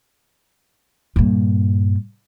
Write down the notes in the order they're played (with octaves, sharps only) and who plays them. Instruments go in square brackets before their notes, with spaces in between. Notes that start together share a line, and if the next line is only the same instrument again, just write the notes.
[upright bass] G2 A#2